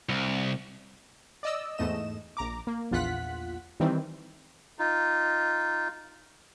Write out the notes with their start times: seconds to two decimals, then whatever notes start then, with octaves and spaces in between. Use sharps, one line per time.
0.09 C2
1.43 D5 D#5 E6
1.78 E2 G#2 A3 D#5 E7
2.37 A#1 A#5 D6
2.67 A#3
2.91 A#1 E2 F4 F#5 F#6 B6
3.80 D#3 E3 G3 C4
4.79 D#4 F4